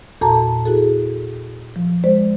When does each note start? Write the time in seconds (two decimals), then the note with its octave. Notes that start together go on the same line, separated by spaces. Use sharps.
0.21 E2 A#2 F#4 A4 A5 A#5
0.66 E4 F#4 G#4 A4
1.76 F3
2.04 G#3 C5 D5